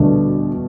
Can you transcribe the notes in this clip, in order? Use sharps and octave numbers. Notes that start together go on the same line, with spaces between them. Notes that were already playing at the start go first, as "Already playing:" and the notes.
Already playing: D2 B2 D3 G3 A3 D4